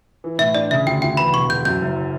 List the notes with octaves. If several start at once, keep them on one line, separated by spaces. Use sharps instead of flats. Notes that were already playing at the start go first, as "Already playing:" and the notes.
E3
A2 E5
D4 D5
C#3 E5
D2 G5
D2 G5
E2 B5
E1 C#6
E1 G6
F#2 G6
F#1